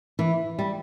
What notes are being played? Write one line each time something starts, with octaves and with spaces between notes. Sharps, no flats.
E3
G3